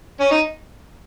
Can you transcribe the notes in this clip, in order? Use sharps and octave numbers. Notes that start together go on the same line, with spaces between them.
C#4
D#4